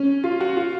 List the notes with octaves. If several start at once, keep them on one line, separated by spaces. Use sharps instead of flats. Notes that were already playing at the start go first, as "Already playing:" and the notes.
Already playing: C#4
F4
F#4
F4